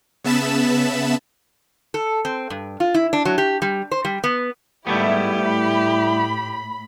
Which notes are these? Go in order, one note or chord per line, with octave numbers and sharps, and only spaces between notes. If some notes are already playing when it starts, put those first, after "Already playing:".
C#3 B3 E5 A5 B5 E7
A4
C4
G2
F4
E4
D4
F#3
G4
G3
C5
G3
B3
G#2 G3 A3 B3 E4 G4
A2 E4 B5